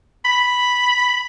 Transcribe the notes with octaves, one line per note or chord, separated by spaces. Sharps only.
B5